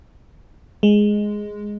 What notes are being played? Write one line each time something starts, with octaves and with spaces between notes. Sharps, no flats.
G#3